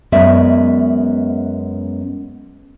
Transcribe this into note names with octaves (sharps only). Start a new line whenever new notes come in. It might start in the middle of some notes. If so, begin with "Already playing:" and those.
F#2 G#3 B3 D5 E5